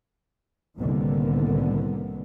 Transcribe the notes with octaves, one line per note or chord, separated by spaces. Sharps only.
C2 A2 D3 D#3 A#3 B3